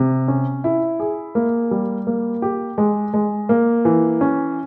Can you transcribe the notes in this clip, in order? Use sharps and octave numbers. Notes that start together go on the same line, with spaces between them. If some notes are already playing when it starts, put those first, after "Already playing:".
Already playing: C3
C#4
E4
G#4
A#3
G3
A#3
G4
G#3
G#3
A#3
E3
C#4